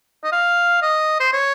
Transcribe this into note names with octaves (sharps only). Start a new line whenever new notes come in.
D#5
F5
D#5
C5
C#5